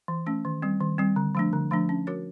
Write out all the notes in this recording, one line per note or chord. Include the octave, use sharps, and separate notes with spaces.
E3
A3 C#4
D#3
G3 C4
D#3
G3 C4
D3
F3 A3 D4
D3
F3 A3 D4
C#4
F#4 A#4 C#5